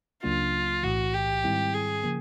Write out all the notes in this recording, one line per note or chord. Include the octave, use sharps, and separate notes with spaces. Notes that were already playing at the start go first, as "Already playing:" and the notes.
C#2 C#3 F#3 A#3 D4 F4
B1 A2 E3 F#4
G4
G#2 D#3 G3 C4 E4
G#4
C#3 F3 A#3